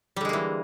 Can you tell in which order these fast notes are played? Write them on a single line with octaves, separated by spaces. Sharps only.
G3 D3 G#3 A#3 E3